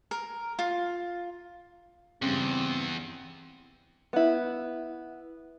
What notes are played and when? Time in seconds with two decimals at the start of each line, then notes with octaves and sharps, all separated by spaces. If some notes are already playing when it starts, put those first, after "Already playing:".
0.11 A#4
0.59 F4
2.22 E2 G2 C#3 C4
4.13 B3 E4